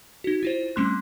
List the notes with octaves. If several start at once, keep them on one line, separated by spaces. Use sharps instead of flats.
D#4 F#4
E4 F4 C5
G3 A3 C4 C#4 C6 F#6